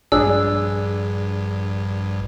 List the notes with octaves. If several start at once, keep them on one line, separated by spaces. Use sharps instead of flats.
A#1 G2 D4 G#4 E6